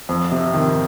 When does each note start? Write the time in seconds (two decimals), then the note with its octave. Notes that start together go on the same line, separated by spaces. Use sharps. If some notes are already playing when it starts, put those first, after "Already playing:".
0.09 F2
0.32 C3
0.54 D#3